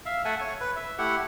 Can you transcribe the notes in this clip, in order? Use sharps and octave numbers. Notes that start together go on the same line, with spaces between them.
E5 F5
A3 A4 E5 F#5 G#5
C#5
B4
E5
A3 E4 G4 F#5